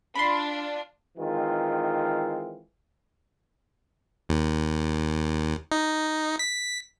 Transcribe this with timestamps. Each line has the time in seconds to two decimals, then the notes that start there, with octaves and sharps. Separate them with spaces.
0.15 D4 F4 B5 C6
1.17 D#3 E3 G#3 C4 F4
4.29 D#2
5.72 D#4
6.39 B6